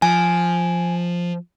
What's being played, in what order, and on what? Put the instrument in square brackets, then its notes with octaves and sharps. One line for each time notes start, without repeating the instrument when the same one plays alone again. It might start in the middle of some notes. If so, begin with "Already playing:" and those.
[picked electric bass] F3 [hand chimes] G#5